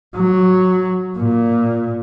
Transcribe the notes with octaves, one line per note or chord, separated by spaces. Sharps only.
F#3
A#2